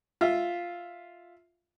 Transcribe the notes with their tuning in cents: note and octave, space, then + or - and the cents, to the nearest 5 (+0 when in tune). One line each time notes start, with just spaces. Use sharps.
F4 +0 E5 +0